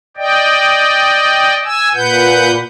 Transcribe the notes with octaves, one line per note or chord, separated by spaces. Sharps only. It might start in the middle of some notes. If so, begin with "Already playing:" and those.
D5 D#5 G5
G#5 E6
A#2 B4 F#5 G6